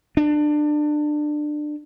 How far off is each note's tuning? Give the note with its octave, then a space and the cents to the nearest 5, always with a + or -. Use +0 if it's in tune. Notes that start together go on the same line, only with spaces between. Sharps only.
D4 +25